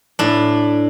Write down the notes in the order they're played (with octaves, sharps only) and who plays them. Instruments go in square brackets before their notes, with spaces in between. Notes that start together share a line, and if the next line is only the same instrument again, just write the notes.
[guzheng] A2 D4